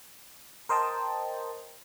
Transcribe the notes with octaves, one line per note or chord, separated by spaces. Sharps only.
A#4 C5 D#5 G5 A5